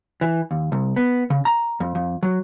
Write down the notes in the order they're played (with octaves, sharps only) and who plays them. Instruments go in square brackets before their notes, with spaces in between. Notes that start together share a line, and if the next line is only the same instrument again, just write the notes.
[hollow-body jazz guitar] E3
D#2
C2
B3
C#3
A#5
F2
F2
F#3